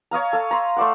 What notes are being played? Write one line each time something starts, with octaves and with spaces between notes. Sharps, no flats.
C#5 D#5 F5 A#5
A4 F5
A#5 C6
A3 C5 D5 F#5